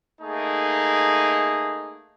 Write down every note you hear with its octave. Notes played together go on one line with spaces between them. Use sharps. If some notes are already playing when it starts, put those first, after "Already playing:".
A3 A#3 D#4 G#4